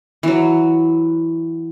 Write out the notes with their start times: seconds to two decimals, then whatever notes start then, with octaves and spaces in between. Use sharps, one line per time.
0.23 E3 F#3